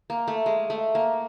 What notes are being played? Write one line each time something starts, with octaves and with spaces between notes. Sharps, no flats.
A#3
A3
G#3
A3
A#3